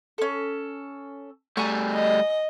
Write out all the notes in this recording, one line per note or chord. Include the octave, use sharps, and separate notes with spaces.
C#4 A4
G3 A3 G#5 A#5 C#6
D#5